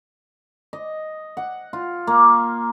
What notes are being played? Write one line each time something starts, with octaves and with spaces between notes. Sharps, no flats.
D#5
F#5
F4
A#3